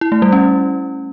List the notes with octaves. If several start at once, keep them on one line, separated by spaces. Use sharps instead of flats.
E4
A3
G3
C#4